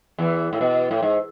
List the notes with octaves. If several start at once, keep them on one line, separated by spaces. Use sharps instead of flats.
E2 E3
A2
B2
A2
G#2